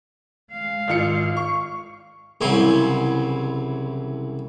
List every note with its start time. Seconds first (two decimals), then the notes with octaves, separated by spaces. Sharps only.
0.52 G#3 F5
0.88 G#1 F4 C#7
1.37 C#6
2.41 C2 C#3 E3 F#3 C6